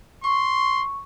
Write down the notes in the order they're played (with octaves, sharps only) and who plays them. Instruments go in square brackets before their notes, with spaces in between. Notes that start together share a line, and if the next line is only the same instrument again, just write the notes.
[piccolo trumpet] C6 [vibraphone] C#6